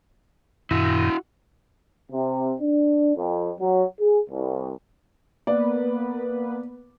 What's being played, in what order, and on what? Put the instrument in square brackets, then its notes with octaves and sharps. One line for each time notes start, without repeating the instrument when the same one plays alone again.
[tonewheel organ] F#2 A#2 D#3 [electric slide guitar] E4 F#4
[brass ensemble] C3
D4
F2
F#3
G#4
C2
[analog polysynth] A#3 B3 B4 [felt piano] D5